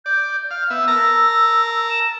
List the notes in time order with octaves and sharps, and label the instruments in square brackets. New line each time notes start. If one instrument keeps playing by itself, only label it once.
[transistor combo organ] D5 [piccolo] G6
[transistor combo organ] F5 [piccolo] F6
[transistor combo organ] B3 E5 [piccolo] E6
[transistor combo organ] A#4 A5 A#5
[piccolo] E7